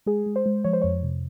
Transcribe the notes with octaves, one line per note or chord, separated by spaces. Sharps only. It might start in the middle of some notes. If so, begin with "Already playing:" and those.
G#3 G#4
G#3
C5
G#3
F3 C#5
C5
F2 C#5
C3